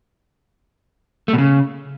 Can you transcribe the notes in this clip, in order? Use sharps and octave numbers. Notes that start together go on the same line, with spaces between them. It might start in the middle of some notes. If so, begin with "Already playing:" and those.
A3
B2
C#3